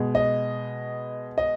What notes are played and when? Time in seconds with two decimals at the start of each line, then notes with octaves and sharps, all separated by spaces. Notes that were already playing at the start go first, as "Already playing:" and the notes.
Already playing: B2 G#3
0.15 D#5
1.38 D#5